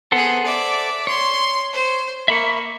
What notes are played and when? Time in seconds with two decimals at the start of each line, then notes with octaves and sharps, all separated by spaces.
0.12 B3 G#4 A4 C5 F#5
0.45 D5 E5
1.07 C#5 C6
1.73 C5
2.28 A#3 E5 B5 C#6